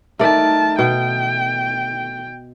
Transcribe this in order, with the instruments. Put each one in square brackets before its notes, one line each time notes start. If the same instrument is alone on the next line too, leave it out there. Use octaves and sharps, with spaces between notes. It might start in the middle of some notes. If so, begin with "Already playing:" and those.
[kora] A3 A#4 D5 [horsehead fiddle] D#4 A5
[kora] B2 [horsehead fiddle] G5